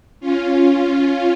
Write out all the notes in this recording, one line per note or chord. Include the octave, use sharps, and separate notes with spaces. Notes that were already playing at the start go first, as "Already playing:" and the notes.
C#4 F4